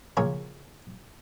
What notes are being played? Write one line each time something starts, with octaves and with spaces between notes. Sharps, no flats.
A#1 A#2 C#3 G#4 A#4 C#5